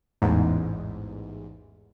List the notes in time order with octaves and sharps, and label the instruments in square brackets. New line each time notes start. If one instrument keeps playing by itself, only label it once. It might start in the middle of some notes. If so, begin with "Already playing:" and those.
[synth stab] A1 E2 G#2